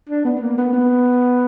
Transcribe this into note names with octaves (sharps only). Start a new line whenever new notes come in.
D4
B3
B3
A#3
B3
B3